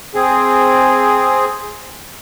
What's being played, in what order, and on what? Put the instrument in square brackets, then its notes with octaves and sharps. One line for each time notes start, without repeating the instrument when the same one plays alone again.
[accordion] C4 G#4